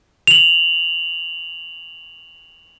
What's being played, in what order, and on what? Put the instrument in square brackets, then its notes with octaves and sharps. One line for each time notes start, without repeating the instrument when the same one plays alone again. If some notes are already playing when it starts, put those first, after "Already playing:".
[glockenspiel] F7 F#7